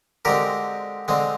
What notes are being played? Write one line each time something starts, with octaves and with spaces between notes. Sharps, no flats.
D3 G#3 C4 G4 A#4
D3 G#3 C4